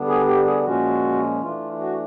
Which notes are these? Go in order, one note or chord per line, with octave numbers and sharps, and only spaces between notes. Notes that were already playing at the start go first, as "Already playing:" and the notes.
Already playing: D3 G3 B3 D4
G#4
G4
G#4
A#2 F3 G#3 C#4 F#4
E3 A3 D4 F4
F#4